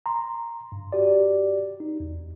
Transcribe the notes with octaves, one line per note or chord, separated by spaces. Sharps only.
A#5 C6
G2
F#4 G4 D5
D#4
E2